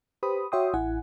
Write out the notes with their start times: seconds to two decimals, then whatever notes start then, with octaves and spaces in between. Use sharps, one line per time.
0.23 G4 B4 C5 B5 D#6
0.52 F#4 C#5 E5 G5 C6 D#6
0.73 A1 E4 F#5 G#5